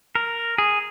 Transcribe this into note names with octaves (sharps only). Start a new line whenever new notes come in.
A#4
G#4